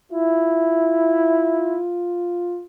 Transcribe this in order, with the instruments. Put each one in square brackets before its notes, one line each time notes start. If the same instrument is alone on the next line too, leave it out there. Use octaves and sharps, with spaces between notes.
[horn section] E4 [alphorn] F4